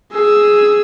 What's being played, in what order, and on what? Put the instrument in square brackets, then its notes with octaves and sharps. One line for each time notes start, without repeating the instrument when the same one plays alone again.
[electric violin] G#4 E6